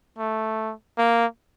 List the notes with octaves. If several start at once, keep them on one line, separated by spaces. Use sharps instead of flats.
A3
A#3